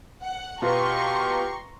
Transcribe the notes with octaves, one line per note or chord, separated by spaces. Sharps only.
F#5
B2 F4 G4 B4 A#5 C6 C#6